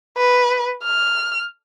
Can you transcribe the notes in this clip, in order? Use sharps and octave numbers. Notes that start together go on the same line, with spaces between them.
B4
F6